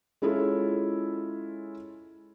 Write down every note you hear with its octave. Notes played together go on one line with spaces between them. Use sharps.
G#3 C#4 E4 F4 G#4 A4